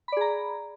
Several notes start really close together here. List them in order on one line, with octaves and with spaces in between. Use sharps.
B5 D5 G#4 A#5